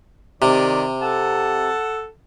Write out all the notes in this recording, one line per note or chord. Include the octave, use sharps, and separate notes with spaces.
C3 D#3 D5
A4 F#5 A5